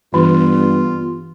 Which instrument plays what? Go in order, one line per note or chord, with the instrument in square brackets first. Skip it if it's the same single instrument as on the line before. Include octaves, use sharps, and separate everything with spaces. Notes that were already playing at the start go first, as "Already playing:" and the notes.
[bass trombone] G2 [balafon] E3 [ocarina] B3 [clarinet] F4